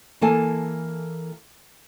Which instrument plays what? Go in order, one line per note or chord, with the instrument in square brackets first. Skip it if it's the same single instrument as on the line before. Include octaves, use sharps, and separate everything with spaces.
[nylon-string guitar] E3 A#3 A4 G#5 A5